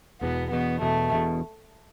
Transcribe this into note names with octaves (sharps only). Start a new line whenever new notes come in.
E1 E2 B2 B3
E1 E2 B2 B3
E1 E2 B2 A3
E1 E2 B2